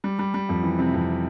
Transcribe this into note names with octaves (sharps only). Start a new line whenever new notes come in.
G3
G3
G3
F2
E3
C3
F2